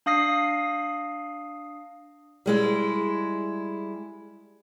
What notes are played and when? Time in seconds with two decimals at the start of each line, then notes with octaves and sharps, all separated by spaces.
0.06 D4 F5 D#6 A#6 C7
2.46 G3 G#3 E4